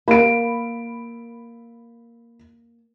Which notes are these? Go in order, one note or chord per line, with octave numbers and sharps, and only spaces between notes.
A#3 B5 D7